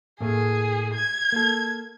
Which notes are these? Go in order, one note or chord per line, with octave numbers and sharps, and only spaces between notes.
A2 A3 A#3 G#4
G#6
A#3 A4